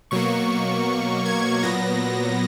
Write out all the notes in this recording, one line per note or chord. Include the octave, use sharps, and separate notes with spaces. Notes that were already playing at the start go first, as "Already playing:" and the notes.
B2 F#3 A#3 C#6
G#6
A#2 F#3 B3 A#6